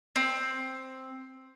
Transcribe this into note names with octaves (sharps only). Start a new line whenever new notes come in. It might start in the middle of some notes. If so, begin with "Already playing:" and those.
C4